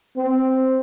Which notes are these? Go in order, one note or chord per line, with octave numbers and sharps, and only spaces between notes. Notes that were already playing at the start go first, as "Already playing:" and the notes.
C4